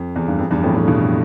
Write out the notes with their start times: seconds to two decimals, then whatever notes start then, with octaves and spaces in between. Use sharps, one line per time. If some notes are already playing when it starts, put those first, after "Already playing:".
Already playing: F2
0.16 E2
0.28 G2
0.39 F2
0.51 E2 G2
0.63 F2 A2
0.75 F2 A2
0.87 G2 B2